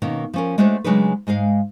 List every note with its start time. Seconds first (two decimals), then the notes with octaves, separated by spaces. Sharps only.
0.02 B2 D#3 A#3 C#4
0.34 F3 C#4 A#4
0.58 G#3 A3 D4 F#4 C5 C#5
0.84 C#3 F#3 G#3 D4 D#4 B4
1.27 G#2 G#3 D#5 F5